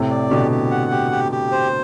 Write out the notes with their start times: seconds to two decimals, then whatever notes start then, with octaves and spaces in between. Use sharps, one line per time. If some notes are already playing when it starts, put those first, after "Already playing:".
Already playing: A2 C3
0.11 D5
0.30 B2 D3 G4
0.51 G4
0.71 F#5
0.91 G4
1.11 G4
1.32 G4
1.52 C5